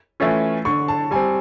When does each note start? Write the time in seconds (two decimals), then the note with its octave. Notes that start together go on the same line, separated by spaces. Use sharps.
0.20 E3 A3 C#4 F4
0.65 D3 C#6
0.88 A5
1.11 G3 C4 G#5